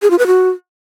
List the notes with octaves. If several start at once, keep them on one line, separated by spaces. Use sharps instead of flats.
G#4
F4
B4
F#4